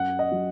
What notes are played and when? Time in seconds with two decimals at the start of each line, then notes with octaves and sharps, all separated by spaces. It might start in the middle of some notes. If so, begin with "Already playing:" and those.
Already playing: F#2 F#5
0.19 D#5
0.31 F#3